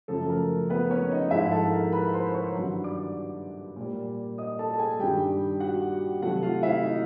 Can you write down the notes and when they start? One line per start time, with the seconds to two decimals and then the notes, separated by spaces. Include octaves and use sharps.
0.08 F#2 C#3 F3 A3 A4
0.29 A#4
0.70 B3 B4
0.91 C#4 C#5
1.11 D#4 D#5
1.31 G#2 F3 G#3 E4 E5
1.51 A4 A5
1.72 A#4 A#5
1.92 B4 B5
2.13 C5 C6
2.33 C#5 C#6
2.53 G2 D#3 F#3
2.84 D5 D6
3.76 A#2 G3
4.38 D#5 D#6
4.59 A4 A5
4.73 A5
4.79 G#4 G#5
4.99 G2 D#3 G3 G4 G5
5.60 F#4 F#5
6.22 C3 D#3 F#3 A3 F#4 F#5
6.43 F4 F5
6.63 E4 E5
6.83 D#4 D#5